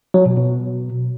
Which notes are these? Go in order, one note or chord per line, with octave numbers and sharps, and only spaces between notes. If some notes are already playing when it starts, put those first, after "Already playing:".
F#3
B2
B2